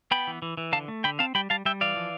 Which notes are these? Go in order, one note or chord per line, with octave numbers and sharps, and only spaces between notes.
B3 G5 B5
E3
E3
E3
D3 F5 A5
A3
D3 G5 B5
C4 F5 A5
G3 G5 B5
G3 F5 A5
G3 E5 G5
E3 D5 F5
F3